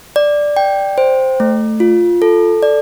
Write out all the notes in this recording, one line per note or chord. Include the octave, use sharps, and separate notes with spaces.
D5
G5
C5
A3
F4
A4
D5